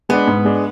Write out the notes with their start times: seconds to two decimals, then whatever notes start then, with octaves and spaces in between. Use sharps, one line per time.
0.09 G#3 B3 D4
0.28 G#2
0.45 G#3 D4